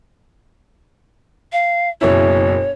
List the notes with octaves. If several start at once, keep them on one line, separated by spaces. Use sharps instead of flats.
F5
F#1 B2 E4 C#5